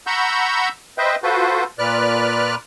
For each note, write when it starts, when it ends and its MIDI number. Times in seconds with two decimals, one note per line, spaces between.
0.07 0.69 78
0.07 0.69 82
0.07 0.69 83
0.07 0.69 85
0.07 0.69 88
0.07 0.69 91
0.98 1.15 71
0.98 1.15 72
0.98 1.15 75
0.98 1.15 76
0.98 1.15 79
1.23 1.64 65
1.23 1.64 66
1.23 1.64 69
1.23 1.64 71
1.23 1.64 72
1.79 2.55 46
1.79 2.55 71
1.79 2.55 74
1.79 2.55 89
1.79 2.55 90